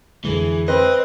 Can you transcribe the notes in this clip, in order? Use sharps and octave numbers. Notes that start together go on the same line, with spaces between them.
F2 D3 E3 G#3 G#4
C4 B4 D#5